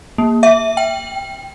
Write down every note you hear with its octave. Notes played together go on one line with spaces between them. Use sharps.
A#3
E5
G5